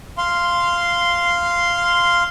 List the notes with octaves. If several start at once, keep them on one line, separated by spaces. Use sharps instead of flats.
F5 C6